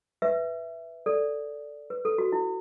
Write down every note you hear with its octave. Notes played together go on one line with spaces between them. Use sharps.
B4 E5
A4 D5
B4
A4
F#4
E4